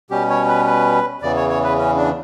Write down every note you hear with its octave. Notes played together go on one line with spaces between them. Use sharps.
B2 G3 C#4 G4
C#5
B4
B4
E2 C#3 E3 D5
C#5
C#5
B4
C#4
D4